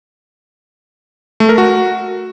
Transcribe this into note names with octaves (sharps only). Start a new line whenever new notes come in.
A3
A#4
F#4